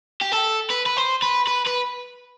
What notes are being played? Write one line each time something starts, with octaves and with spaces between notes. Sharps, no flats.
G4
A4
B4
B4
C5
B4
B4
B4